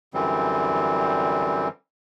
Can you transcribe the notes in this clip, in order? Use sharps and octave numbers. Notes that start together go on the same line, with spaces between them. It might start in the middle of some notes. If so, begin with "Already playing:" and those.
F#2 D3 E3 G3 C4